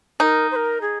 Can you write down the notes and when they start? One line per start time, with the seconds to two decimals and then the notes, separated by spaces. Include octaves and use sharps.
0.20 D#4 A#4
0.51 C5
0.56 A#4
0.81 G#4